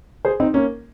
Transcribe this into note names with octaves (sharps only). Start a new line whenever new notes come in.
G#4 C5
C4 D#4
A#3 C#4